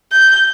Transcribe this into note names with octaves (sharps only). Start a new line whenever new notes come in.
G6